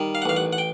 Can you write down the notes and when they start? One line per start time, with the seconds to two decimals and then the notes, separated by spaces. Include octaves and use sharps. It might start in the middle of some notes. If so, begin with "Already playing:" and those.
Already playing: D#3 G3
0.15 F5
0.22 F#5
0.25 A1 F5
0.37 F#5
0.53 F#5
0.58 G5